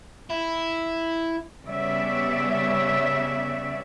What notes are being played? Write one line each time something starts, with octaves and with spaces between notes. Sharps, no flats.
E4
C#3 G3 B3 C#4 D5 E5